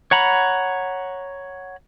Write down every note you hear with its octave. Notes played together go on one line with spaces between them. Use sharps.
C#5 F#5 A#5 B5